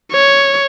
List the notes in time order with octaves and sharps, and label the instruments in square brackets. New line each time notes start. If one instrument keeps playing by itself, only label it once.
[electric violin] C#5